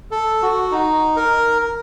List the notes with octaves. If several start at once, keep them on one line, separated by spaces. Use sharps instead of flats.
A4
F#4
D#4
A#4